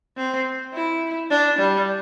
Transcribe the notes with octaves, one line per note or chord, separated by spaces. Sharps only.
C4
E4
D4
G3